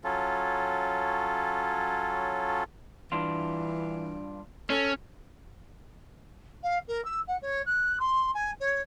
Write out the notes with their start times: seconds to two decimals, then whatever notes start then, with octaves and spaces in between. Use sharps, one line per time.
0.04 F#3 C#4 F4 A4
3.12 G2 E3 D4 F4
4.70 C#4 A4
6.63 F5
6.87 A#4
7.04 E6
7.27 F#5
7.42 C#5
7.66 F#6
7.99 C6
8.34 G#5
8.60 C#5